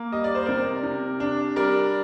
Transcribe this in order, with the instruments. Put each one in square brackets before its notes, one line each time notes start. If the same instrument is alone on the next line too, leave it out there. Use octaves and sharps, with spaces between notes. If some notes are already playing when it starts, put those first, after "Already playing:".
Already playing: [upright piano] A#3
G3 D#5
D5
C5
C3 A#4 D5
C3
D4
G3 A#4 D5